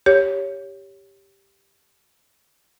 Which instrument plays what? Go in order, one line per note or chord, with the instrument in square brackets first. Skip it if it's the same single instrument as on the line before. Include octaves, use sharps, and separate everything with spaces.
[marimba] G4 C#5